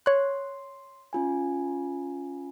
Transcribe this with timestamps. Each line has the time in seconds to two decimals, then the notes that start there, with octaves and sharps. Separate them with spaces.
0.06 C#5 C6 F#6
1.13 C#4 F4 G#5